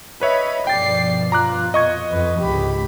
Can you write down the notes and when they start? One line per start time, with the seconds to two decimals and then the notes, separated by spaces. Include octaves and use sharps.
0.21 B4 C#5 D#5 E5 B5
0.67 G2 B2 F3 D5 G5 A6 C7
1.32 F4 A#5 D6 F#6
1.74 F2 B2 D#5 C#6 G#6
2.12 F2 B4
2.40 C#2 G#2 D3 G4 B5